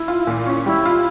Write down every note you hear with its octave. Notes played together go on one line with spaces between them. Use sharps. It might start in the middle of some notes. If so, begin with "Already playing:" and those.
Already playing: E4
F4
A#2
C#4
G3 E4
F4